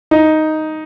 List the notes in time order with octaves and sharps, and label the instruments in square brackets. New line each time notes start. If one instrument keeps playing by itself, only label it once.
[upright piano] D#4